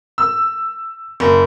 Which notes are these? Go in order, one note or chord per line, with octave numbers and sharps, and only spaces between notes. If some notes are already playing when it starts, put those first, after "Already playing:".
E6
F#1